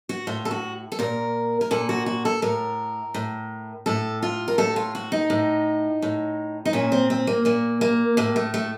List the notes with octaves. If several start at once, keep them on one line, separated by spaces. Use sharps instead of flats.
F#4
A2 F4
A4
F#4
A4
A#2 A#4
A#4
A#2 A4
F#4
F#4
A4
A2 A#4
A2
A2 A4
F4
A#4
A2 A4
F4
F#4
D#4
A2
A2
D#4
A#2 C#4
C4
C4
A#3
A#2 A#3
A#3
A2 A#3
A3
A3